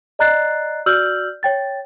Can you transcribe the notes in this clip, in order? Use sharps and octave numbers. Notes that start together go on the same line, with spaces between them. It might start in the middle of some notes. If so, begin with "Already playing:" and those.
D5 D#5 A#5 F#6 A6 C7
F#4 D5 E6 F6 G6 F#7
C#5 G5 A6